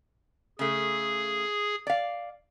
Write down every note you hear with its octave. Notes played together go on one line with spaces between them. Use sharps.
C#3 A3 G#4
D5 F5